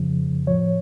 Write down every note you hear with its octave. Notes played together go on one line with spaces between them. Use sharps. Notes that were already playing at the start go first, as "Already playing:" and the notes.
Already playing: F2 C#3 F3
A2 F3 C#5